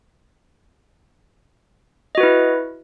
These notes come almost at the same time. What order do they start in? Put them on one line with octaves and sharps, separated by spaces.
D#5 F#4 B4 E4